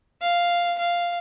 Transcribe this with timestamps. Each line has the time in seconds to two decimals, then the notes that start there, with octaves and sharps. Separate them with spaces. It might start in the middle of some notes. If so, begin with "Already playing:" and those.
0.22 F5
0.79 F5